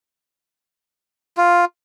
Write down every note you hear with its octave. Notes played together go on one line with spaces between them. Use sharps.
F4